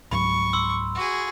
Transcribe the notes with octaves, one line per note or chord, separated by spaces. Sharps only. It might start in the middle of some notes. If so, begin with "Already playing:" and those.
C#2 G#2 F#3 B5 C#6
C6 E6
F#4 G#4